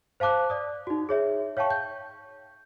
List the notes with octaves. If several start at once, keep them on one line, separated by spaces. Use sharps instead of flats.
C5 F5 A5 D6 F#6
D5 D#6
D#4 F#4
G#4 C#5 E5
C#5 F5 G5 A5 C#6
G6